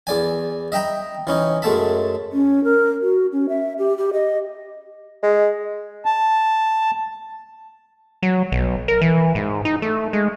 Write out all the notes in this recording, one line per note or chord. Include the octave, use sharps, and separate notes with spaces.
E2 D5 G#5
D#5 E5 G5 A#5 B5
E3 C#4 D#4
F#2 G#3 A3 E5 A5 B5
C#4
A#4
F#4
C#4
E5
G4
G4
D#5
G#3
A5
F#3
B1
A#4
E3
G#2
D#4
A3
G#3